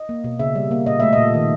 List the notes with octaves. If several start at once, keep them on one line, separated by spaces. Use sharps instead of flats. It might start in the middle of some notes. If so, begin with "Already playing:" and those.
Already playing: D#5
A#3
B2
C#3 E5
G3
A#3
A#2 D#5
A3 E5
A#2 D#5
D#3